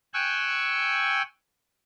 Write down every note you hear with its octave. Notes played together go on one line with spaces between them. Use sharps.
G5 G#5 C#6 E6 F#6